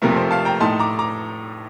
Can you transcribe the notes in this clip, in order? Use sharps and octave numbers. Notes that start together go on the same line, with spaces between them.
F1 F2 C3 F3 A3 A#4
C5
F5 A5
G5 A#5
A2 A3 D#4 A5 C6
A#5 D6
A#5 D6